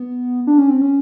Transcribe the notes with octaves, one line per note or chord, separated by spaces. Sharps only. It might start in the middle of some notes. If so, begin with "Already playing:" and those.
Already playing: B3
D4
C#4
C4
C#4